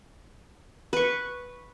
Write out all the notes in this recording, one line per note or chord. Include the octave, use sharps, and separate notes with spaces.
B4 C#6